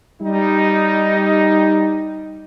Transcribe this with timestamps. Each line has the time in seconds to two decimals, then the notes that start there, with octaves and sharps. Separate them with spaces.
0.21 G3 D#4